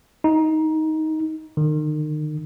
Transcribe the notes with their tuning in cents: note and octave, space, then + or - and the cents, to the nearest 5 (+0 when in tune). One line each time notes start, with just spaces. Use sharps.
D#4 +15
D#3 -35